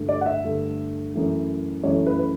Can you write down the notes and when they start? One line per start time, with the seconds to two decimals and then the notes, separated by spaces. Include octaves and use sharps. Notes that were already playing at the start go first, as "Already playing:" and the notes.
Already playing: G2 D3 A3
0.09 D5
0.21 F#5
0.26 E5
0.44 G2 D3 A3
1.14 F#2 E3 A3
1.84 F#2 E3 A3 C#5
2.06 B4
2.19 B4